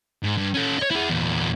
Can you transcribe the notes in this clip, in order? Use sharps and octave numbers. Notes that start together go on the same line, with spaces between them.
G#2
G2
C#4 A4
C#5 D#5
E4 G#4
E2 A#2